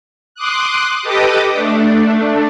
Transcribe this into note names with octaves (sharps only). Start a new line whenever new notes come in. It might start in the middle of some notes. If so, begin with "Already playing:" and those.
C6 D6 D#6 F#6
G4 A4 B4 D#5 D6 D#6
A3 D4